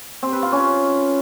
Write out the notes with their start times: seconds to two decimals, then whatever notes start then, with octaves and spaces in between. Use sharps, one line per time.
0.23 C4
0.32 B4
0.42 F4
0.52 C#4